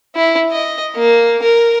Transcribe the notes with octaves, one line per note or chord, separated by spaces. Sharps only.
E4
D#5
A#3
A#4